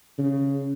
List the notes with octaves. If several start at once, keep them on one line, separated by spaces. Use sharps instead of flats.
C#3